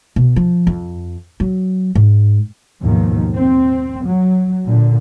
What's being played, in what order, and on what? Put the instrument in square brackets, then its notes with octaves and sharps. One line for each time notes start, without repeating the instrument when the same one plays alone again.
[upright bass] B2
F3
F2
F#3
G#2
[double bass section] D#2 G#2 B2 D#3 F3
C4
F#3
A#2 D3